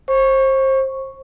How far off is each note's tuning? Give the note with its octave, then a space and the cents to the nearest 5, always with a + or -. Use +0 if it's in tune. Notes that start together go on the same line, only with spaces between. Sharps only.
C5 +30 C#6 +0